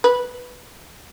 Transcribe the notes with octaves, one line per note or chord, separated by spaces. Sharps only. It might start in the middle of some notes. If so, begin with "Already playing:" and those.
B4